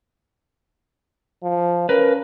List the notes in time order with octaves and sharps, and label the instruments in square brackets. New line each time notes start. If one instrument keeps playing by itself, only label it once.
[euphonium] F3
[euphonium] C#4 [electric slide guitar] A#4 B4